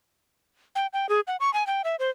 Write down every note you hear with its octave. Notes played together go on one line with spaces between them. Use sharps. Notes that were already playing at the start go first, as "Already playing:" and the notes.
G5
G5
G#4
F#5
C#6
G#5
G5
E5
C5